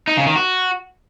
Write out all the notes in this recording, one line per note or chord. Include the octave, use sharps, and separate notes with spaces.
D#4
C#3
D#3
F#4